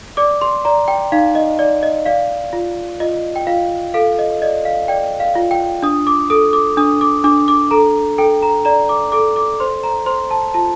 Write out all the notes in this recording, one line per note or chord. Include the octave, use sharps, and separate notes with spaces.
D5 D6
C6
D5 A#5
G5
D#4 F5
D#5
D5
D#5
D5 F5
F4
F4 D#5
G5
F4 F5
A4 F5
D#5
D5 D#5
F5
D5 G5
F5
F4
G5
D4 D#6
D6
A4 D#6
D6
D4 D#6
D6
D4 D6
D6
A4 A#5
A4 G5
A#5
D5 A#5
D6
A4 D6
D6
C5 C6
A#5
C5 C6
A5
F4 A5